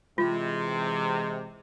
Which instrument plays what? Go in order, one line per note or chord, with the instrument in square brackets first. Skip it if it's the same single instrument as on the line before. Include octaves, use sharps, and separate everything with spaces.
[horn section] C3 [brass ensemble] E3 G#3 [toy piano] F4